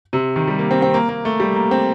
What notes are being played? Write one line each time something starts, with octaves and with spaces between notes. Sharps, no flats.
C3
D#3
G3
A#3
C4
C4
A#3
A#3
A3
G3
A#3
C4